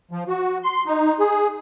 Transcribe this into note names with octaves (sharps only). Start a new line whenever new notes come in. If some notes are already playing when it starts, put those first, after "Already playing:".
F3
F#4
C6
D#4
G#4